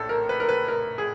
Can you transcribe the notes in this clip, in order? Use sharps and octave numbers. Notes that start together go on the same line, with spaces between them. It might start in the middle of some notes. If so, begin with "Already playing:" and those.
Already playing: A#1 A2 A4
A#4
B4
A#4
B4
A#4
G#4